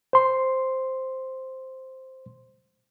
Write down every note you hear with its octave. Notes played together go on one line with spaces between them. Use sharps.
C5 C6